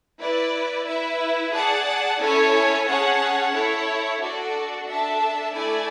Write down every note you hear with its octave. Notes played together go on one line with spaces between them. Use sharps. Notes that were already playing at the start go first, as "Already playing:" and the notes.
E4 B4 D5
E4 B4 E5
G#4 D5 F#5 A5
C#4 E4 A4 C#5 G#5
C#4 G#4 C#5 F#5 A5
E4 A4 C#5
D4 F#4 A4 D5
D4 A4 E5 A5
A3 E4 A4 D5 G#5